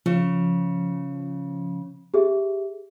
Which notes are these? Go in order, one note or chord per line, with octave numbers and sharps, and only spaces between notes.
C#3 F3
G4 G#4 E5